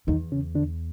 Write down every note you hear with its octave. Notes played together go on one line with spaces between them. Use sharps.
E2 D#3 D#4
C#3 C#4
D3 D4